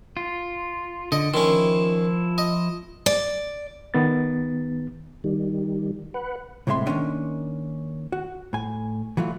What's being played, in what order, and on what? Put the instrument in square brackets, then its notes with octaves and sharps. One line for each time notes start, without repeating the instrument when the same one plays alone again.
[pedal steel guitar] F4
[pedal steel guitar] D3 [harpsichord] D#5
[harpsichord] D#3 C#4 [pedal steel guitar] F3 E4 C6
[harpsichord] D#5
[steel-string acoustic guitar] D5
[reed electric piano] D#3 B3 A6
[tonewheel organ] D#3 G3
B4 F#5
[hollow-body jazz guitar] C2 A2 C3 G#3 E5 C6
D#3 A#3 C#4 D4
F#4
A2 G#5
E3 F#3 A3 F4